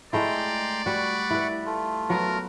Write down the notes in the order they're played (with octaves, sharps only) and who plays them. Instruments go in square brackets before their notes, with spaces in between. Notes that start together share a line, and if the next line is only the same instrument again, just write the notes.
[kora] G#3 A3 E4 [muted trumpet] D5 [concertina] G5 A#5 C6
[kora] G3 F#4 [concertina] F#5 B5 C#6
[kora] E4 B4
[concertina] A3 F4
[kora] F#3 B3 [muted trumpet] A#4